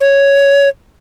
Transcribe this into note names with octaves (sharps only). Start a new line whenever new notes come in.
C#5